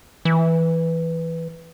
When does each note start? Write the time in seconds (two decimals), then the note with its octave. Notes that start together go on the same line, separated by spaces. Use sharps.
0.25 E3